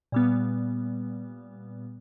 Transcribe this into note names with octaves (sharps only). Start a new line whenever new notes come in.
A#2 G3 B3